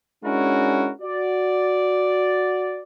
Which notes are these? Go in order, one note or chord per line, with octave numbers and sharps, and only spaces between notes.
G#3 C#4 D4 E4 F#4 A#4
F#4 D5